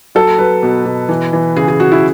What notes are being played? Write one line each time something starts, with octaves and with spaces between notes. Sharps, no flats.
F#3 A4
F#3 B4
B2
B2
E3
E3
C#3 G#4
G#4
C#3 F#4
E4